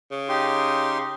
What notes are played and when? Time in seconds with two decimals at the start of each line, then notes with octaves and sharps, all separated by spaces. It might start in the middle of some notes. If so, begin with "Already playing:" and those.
0.11 C#3
0.29 D#4 G4 C6